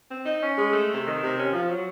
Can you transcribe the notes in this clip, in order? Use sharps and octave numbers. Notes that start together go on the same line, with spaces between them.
C4
D#4
C#4
G#3
A3
C3
D#3
C3
C#4
F3
F#3